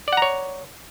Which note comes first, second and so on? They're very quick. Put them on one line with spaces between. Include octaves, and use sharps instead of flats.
D5 F#5 A#5 C#5